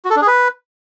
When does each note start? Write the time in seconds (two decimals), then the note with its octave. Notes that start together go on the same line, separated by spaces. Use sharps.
0.05 F#4
0.10 A4
0.16 D4
0.22 G#4
0.27 B4